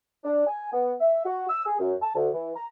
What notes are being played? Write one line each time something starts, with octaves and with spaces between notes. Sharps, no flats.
D4
G#5
B3
E5
F#4
E6
G#4
F#2
A5
D2
E3
A#5